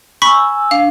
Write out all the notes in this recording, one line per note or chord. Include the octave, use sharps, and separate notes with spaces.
G#5 B5 C#6 E6 B6
D4 F5